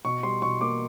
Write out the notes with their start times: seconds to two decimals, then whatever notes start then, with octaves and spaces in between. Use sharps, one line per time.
0.05 B2 C#6
0.23 G3 C6
0.42 B2 C#6
0.61 A#3 D6